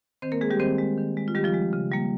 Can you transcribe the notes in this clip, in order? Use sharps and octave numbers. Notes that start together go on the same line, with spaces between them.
D#3 C4 C5
A#3 A#4
G#3 G#4
G3 G4
D#3 C4 C5
G#3
D#3
G#3
F4
D#3 G3 G4
F3 F4
G#3
C#3
G3 A#3